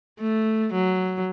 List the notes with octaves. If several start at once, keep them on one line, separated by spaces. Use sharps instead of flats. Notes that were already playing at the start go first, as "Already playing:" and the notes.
A3
F#3